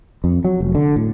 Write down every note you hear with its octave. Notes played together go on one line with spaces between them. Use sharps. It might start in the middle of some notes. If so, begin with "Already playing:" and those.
F2
F#3
F1
D3
A2